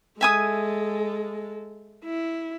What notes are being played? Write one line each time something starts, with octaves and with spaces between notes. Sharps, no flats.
G#3 A4 E5 G#5 D#6
E4